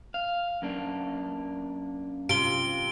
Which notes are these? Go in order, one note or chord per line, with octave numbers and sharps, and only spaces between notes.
F5
F#2 A#3 D4
C3 F4 D7 G7